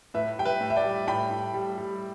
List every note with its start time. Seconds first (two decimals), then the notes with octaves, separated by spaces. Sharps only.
0.14 A2 B4 E5
0.38 G3 G5
0.45 B4 E5
0.61 A2
0.70 E5
0.76 D5 G5
0.84 G3
1.07 A2 G5 B5
1.31 A2
1.54 G3
1.78 G3